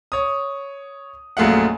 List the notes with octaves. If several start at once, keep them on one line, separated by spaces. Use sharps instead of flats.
C#5 D#6
A#1 F#2 A3 G#4 F5 F#5